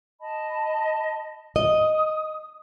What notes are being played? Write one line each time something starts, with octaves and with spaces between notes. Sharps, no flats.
D#5 A5 B5
D#5 D#6